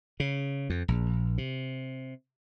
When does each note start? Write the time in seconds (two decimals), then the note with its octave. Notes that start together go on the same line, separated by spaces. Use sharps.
0.20 C#3
0.70 F2
0.88 A#1
1.38 C3